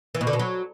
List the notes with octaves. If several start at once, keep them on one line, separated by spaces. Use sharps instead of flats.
E3
B2
D3
B2
F#3